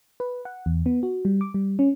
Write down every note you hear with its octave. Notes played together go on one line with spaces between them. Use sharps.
B4
F#5
E2
B3
F#4
G3
D6
G3
C#4